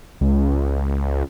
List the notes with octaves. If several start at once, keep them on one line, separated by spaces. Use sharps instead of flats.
C#2